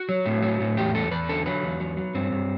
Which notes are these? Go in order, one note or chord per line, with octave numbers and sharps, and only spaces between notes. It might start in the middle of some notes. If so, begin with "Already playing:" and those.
Already playing: F#4
F#3
A2
F#3
A2
E2 G4
E2 A4
E2 B4
D3 A4
F#3 B4
E2
F#3
F#3
G2 C4
G2